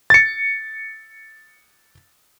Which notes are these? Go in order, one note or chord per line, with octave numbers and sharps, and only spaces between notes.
A6 C#7